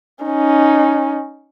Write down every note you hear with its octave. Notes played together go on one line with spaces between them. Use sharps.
C#4 D#4